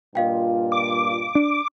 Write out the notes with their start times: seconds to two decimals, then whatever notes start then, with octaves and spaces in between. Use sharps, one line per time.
0.15 G2 A#2 F4 D#5 F5 G5
0.72 D6
1.35 D4